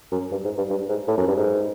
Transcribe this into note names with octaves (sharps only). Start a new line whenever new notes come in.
F#2
G2
G#2
G2
G2
G#2
A2
F#2
G2
G#2